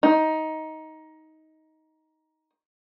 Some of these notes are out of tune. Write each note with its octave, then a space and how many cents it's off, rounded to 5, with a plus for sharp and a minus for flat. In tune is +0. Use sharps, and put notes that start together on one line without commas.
D#4 +15